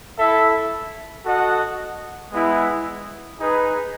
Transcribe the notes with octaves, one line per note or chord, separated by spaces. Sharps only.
E4 A4 E5
F#4 A4 D#5 F#5
G#3 B3 E4
D#4 G#4 B4